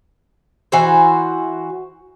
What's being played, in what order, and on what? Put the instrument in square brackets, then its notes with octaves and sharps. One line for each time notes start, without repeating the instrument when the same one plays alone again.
[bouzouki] E3 F#4 C5